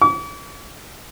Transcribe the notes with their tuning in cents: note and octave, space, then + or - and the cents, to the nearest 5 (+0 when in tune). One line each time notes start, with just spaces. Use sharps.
D6 -45